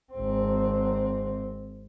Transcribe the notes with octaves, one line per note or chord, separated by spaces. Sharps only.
G#1 C4